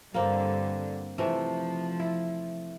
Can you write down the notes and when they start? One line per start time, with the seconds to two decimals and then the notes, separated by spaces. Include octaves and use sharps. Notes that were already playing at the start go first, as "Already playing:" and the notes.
0.14 G2 D3 A#3 C4
1.18 C3 E3 F3 A3
2.00 E4